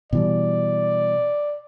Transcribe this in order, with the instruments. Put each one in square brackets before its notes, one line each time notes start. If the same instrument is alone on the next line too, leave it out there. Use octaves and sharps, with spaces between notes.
[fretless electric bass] B2 E3 G3 [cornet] D5